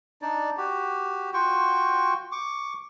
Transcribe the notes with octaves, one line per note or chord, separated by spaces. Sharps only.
D4 D#4 D5
F#4 G4
F4 F#4 G5 C#6
C#6 D6